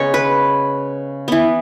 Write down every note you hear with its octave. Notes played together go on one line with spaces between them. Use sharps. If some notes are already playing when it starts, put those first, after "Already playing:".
Already playing: C#3 G#3 B3 C#5
B4
E3 B3